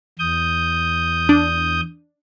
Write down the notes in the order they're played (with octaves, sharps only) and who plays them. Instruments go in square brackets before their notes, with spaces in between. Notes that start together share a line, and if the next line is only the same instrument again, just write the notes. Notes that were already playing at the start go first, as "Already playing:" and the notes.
[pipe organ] E2 D#6 G6
[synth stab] D4